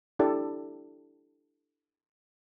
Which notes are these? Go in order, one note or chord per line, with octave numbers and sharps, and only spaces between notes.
D4 E4 G4 A4 D5